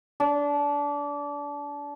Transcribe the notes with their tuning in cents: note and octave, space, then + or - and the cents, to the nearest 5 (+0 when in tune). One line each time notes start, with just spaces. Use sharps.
D4 -25